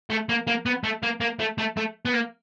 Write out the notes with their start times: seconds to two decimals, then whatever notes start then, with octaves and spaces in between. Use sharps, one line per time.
0.10 A3
0.29 A#3
0.47 A#3
0.66 B3
0.84 A3
1.03 A#3
1.20 A#3
1.39 A3
1.58 A3
1.77 A3
2.05 B3
2.14 A#3